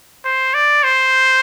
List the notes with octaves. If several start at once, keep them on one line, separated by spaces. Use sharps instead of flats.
C5
D5
C5